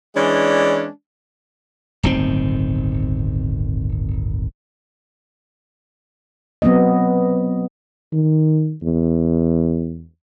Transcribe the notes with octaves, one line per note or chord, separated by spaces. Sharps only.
E3 G#3 C#4 D4 D5
D1 G1 D#3 C4
F#3 B3 C4 D#5
D#3
E2